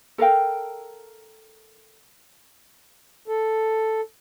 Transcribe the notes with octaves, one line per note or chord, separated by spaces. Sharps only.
A4 A#4 F5 G5
A4